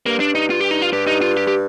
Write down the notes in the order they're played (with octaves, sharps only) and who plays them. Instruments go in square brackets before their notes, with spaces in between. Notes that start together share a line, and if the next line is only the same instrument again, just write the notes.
[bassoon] G2 [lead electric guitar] A#3
[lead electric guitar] D4
D#4
F4
G4
D#4
F4
[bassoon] G2 [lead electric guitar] G4
[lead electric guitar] D#4
F4
G4
G4